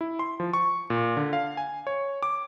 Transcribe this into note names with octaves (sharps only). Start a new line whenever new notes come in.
E4
C6
F3
C#6
A#2
D3
F5
G#5
C#5
D6